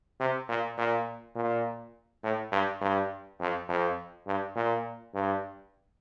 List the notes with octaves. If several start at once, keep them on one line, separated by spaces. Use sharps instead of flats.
C3
A#2
A#2
A#2
A2
G2
G2
F2
F2
G2
A#2
G2